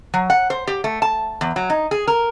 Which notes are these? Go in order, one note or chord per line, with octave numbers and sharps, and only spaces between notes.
F#3
F#5
C5
G4
A3
A5
E2
F#3
D#4
G#4
A#4